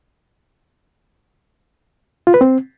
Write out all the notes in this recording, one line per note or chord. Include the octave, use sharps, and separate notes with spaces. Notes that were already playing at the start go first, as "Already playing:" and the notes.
F4
B4
C4